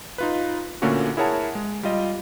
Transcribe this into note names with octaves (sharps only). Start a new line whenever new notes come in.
D#4 F4 B4
A#2 D3 A3 A#3 C#4 F#4
E4 G#4 A#4 C#5 F#5 A5
G#3
G3 F4 D#5